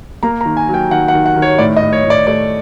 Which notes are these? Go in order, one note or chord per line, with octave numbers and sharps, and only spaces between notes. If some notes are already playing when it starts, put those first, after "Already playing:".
A#3 A#5
A#5
D#3
G#5
F#3
G5
D#3 F#5
F#5
D#3
F#5
D#3
C#5
A2 D5
D#5
A2
C#5
A2
D5
A3 D5